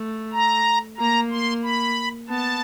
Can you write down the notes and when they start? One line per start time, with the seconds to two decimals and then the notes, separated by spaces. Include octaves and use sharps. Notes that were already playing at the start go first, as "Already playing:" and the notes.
Already playing: A3
0.33 A#5
0.97 A#3 A#5
1.31 C6
1.63 B5
2.28 B3 A5